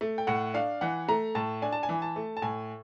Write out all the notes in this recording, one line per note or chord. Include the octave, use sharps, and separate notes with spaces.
A3
G5
A2 F#5
D4 F5
E3 F#5
A3 A#5
A2 A5
D4 G#5
A5
G#5
E3
A5
A3
A5
A2 G#5